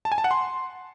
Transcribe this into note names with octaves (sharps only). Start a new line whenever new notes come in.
A5
G#5
A5
F#5
C6